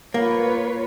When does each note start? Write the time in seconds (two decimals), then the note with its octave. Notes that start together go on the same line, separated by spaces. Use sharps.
0.14 A#3 F4 B4 C#5